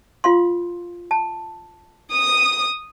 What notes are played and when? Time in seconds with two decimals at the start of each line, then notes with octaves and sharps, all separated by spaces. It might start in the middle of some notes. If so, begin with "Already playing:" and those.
0.24 F4 F5 C6
1.11 A5
2.14 D#6